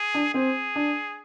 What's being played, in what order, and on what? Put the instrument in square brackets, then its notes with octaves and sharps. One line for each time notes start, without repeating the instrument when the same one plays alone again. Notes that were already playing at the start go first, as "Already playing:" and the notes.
Already playing: [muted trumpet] G#4
[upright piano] D4
[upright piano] C4 [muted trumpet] G#4
[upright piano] D4